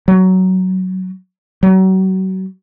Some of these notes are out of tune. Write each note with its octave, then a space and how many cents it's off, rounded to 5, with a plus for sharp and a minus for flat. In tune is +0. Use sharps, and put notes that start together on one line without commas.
F#3 +10
F#3 +35